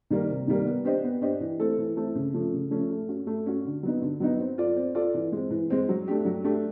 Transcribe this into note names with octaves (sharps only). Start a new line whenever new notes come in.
D#3 G3 A#3
C3
D#3 G3 A#3
B3
D4 G4 C5 D#5
B3
D4 G4 C5 D#5
E3
A3 C4 E4 A4
E3
A3 C4 E4 A4
C#3
F3 A3 C#4
C#3
F3 A3 C#4
A3
C#4 F#4
A3
C#4 F#4
D3
F#3 B3 D#4
D3
F#3 B3 D#4
C4
F4 A4 D5
C4
F4 A4 D5
E3
G#3 C4
E3
G#3 C4
F#3
A3 D4 G4
F#3
A3 D4 G4